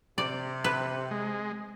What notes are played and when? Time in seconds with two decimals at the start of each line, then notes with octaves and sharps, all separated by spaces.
0.18 C3 D5
0.64 B4
1.11 G#3